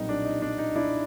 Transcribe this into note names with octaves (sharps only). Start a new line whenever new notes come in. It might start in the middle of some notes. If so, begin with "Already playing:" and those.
Already playing: B1 A#2 G3 C4 D#4
D4
D#4
D4
D#4
D4 E4